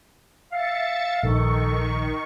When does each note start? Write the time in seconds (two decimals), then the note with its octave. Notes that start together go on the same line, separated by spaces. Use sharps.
0.52 E5 F5 A6 C#7
1.23 A#1 D#3 A4 C#6